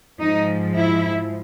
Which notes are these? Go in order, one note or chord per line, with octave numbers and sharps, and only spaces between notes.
G#2 F3 D#4
E4